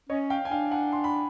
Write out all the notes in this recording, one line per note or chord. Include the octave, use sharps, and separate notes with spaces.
C#4 C#5 D#5
F5 G5
G#5
D4 F5 G5
F#5 G#5
C6
B5